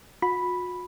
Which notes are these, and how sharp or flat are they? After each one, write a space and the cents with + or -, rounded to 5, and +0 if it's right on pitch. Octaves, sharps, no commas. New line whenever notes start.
F#4 -40 B5 +0